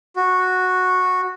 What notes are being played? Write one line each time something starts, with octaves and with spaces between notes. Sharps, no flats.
F#4